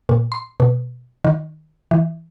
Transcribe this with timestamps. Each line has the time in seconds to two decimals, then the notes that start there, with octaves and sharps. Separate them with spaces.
0.09 A#2
0.32 C6
0.60 B2
1.24 D#3
1.91 E3